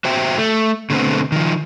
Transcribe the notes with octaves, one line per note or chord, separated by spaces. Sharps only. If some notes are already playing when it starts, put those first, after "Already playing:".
F#4 C5 E5 G5
A3
B2 D3 A3 B3 C4
D#3 F3